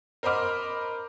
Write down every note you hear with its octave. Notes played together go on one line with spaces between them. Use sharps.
A#4 C5 D#5 B5 D6 F6